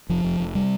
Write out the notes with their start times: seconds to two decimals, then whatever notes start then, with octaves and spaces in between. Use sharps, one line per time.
0.09 F1 F3
0.24 F1
0.40 F1
0.55 C3 G3